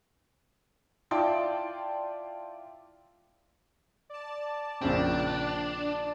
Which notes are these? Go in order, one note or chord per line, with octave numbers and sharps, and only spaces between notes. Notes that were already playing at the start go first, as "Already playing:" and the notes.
E4 F4 D5 G5 A5 C6
D5 A5
A#1 C#3 C4 D4